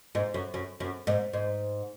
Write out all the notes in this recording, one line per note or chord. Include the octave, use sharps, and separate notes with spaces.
G#2
F#2
F#2
F#2
G#2
G#2